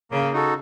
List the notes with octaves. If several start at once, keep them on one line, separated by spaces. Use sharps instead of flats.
C#3 A#3
D#4 F#4 A4